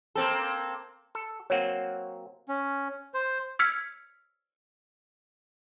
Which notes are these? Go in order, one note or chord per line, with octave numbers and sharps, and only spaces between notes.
A#3 C4 A4
A4
F#3 A#3 C4 C#5 F#5
C#4
C5
E6 F6 G#6 B6 C#7